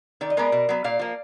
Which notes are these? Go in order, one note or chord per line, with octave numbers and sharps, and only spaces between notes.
D#3 D5
D#5
G#3 B3 A#4 D5
B2
F#3 B3
A#2 D5 F5
F3 A#3